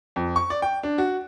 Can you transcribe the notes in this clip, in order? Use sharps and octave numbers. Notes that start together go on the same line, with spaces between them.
F2
C#6
D5
G5
D4
F#4